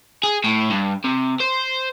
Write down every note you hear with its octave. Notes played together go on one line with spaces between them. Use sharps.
G#4
A2
G2
C3
C5